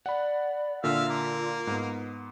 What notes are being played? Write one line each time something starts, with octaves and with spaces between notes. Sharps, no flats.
D5 F#5 B5
A#2 D3 F4 E5 F5
A#3
G#2 B3